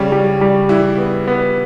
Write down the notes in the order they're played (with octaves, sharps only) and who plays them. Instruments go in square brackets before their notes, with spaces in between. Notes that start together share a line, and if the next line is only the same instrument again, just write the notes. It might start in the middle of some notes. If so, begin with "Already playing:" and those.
Already playing: [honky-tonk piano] C#3 C#4 [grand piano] G3
[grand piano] G3
G3
[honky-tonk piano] E3 E4 [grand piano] G3
[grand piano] B3
B3